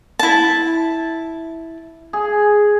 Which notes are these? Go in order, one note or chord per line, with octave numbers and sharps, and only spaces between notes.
E4 A5
G#4